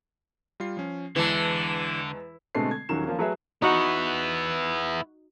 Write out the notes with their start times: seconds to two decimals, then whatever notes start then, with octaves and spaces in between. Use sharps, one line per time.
0.60 G3 F4 C7
0.77 F3 C#4
1.16 E2 D3 E3 G#3 A5
2.55 B2 D3 G#3 A3 C4 C7
2.71 G#6
2.89 D#1 D#3 F#3 C#4 E7
3.06 F3 A#3 C#4
3.19 F#3 A3 G#4 B4 E5
3.62 B3 D#4 E4 F#4 F#5